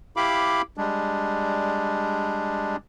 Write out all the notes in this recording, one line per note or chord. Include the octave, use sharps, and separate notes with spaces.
E4 G4 F5 B5 D6
G3 G#3 D4